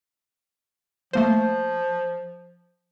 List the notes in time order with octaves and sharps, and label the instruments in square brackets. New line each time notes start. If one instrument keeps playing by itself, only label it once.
[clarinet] F3 [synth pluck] A3 A#3 C5